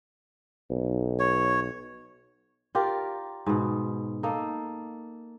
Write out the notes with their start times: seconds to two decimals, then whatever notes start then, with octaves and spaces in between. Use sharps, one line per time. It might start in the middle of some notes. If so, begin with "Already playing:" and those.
0.70 B1
1.20 C#5
2.75 F4 G4 A#4 D5
3.46 G#2 B2
4.23 A#3 D#4 A4